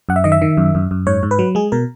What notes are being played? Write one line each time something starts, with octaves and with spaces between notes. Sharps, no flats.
F#2 F#5
E5
D#3 D#5
E5
D#3
F#2
F#2
F#2
G#2 C#5
G#2
B4
F#3
G#3 G#4
B2 A#4